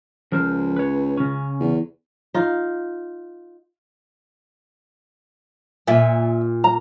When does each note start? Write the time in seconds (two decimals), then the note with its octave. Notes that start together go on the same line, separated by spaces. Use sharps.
0.32 C#2 F3 A#4 C5
0.77 B4 C#5
1.17 C#3 C#4
1.60 E2
2.34 D#4 F4
5.87 A#2 E5 G#5
6.64 A#5